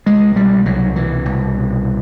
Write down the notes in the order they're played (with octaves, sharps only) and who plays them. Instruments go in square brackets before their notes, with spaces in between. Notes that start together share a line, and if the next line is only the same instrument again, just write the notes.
[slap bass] C2 G#3
B2 G3
C2 F#3
B2 E3
C2
B2